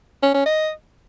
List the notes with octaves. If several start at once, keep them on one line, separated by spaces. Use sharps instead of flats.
C#4
C#4
D#5